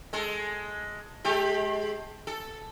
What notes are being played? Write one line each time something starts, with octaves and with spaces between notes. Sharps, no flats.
G#3 A4
G#3 G4 A4
A4